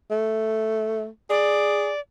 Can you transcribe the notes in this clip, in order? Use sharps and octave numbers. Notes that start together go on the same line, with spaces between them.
A3
G#4 D5